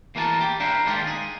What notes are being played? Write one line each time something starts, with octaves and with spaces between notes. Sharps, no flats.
E2 A#3 E4 A#4 G5 A5
G4
D4 E4 F4 A#4 C5
D#3 G#3 A#3 D4 F4 G4
G#4